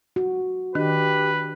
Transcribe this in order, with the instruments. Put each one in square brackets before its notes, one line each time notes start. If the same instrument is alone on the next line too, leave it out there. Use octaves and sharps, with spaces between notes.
[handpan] F#4
[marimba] D#3 [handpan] D4 [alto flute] G4 [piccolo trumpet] B4